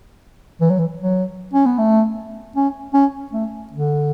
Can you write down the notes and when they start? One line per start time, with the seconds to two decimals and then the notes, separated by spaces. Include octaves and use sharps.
0.61 E3
0.70 F#3
0.79 E3
1.01 F#3
1.53 C#4
1.66 B3
1.78 A3
2.56 C#4
2.94 C#4
3.33 A3
3.73 D3